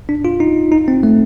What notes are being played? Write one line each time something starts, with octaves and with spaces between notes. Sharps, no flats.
D4
F4
D#4
D#4
C4
A3